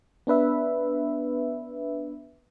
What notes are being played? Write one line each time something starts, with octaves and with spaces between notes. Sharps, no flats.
B3 D4 B4 E5